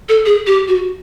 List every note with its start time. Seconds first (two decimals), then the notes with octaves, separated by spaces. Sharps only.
0.09 A4
0.26 G#4
0.47 G4
0.68 F#4